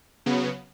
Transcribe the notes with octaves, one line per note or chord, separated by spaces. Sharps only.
C#3 F#3 B3